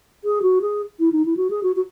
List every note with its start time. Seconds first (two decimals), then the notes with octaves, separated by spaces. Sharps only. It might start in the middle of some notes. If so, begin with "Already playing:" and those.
0.24 G#4
0.42 F#4
0.62 G#4
1.00 E4
1.12 D#4
1.26 E4
1.37 F#4
1.50 G#4
1.63 F#4
1.76 F#4